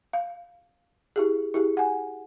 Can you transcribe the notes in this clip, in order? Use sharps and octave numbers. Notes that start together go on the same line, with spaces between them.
F5
E4 G4 G#4
E4 G4 G#4
F#5 G#5